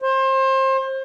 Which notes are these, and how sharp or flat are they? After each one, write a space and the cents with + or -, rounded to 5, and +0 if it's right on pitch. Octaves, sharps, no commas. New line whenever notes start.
C5 +30